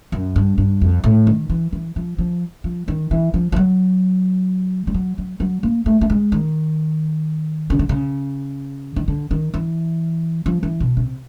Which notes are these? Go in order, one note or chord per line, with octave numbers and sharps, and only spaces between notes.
F#2
G2
G2
F2
A2
D#3
E3
E3
F3
F3
F3
D#3
E3
F3
F3
F#3
G3
F#3
F#3
F#3
A#3
A3
A3
G#3
D#3
C#3
D3
C#3
D#3
D3
D#3
E3
F3
E3
B2
C3